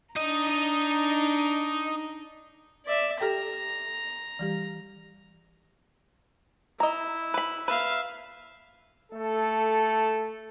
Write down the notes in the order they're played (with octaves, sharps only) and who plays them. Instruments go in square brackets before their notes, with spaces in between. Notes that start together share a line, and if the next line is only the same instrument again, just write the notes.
[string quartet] D4 A#5 [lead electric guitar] D#4 D#5
[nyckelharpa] D5 E5
[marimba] G4 A4 G5 [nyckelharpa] A#5
[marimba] E3 G3 G4
[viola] E4 [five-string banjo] D#5 A#5
[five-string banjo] B4 B5
[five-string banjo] B4 [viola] E5 F5
[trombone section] A3 A4